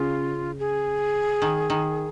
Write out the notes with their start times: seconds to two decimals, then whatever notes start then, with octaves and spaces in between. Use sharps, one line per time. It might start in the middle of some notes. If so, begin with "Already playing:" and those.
Already playing: C#3 F4
0.60 G#4
1.42 D#3
1.70 D#3